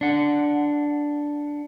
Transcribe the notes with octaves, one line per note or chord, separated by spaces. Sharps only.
D4 F#5